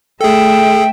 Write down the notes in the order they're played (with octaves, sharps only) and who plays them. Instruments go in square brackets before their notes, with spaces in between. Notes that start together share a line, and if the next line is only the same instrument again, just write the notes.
[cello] A3 E5 [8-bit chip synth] G#4 A4 [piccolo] G5